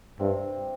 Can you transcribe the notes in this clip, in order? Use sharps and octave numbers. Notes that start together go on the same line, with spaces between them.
G2 C3 C4